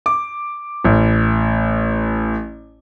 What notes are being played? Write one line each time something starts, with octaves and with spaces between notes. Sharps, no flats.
D6
A1